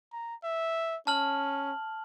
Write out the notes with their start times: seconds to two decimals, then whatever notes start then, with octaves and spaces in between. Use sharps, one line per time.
0.13 A#5
0.44 E5
1.07 C#4 A5 F6 F#7